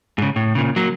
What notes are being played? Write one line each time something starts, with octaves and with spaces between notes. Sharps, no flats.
G#2 C#3
A2
A#2 C#3
F#3 A#3